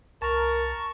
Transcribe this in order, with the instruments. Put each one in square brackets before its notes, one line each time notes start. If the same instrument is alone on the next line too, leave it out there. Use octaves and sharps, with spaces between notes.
[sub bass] C2 [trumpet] A#4 [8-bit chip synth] A5 A#5 [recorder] C#6